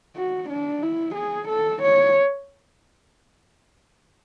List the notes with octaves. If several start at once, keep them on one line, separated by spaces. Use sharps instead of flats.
F#4
D4
E4
G#4
A4
C#5